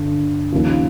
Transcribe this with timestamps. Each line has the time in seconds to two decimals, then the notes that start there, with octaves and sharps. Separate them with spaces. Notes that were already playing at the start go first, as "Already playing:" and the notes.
Already playing: G2 D3
0.52 D#2 C#3 F3